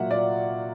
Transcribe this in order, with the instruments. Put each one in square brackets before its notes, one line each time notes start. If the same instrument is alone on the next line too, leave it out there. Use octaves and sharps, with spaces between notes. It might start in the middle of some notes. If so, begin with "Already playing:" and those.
Already playing: [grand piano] A#2 F#3 A#3 E5 F#5
A#2 D5